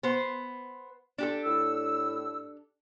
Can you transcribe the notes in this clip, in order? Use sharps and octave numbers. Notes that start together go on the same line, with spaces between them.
B3 C5
D4 G4 A4
A2 E6